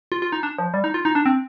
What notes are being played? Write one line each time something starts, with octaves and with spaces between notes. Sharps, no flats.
F4
F4
D#4
D4
F3
G3
D#4
F4
D#4
D4
C4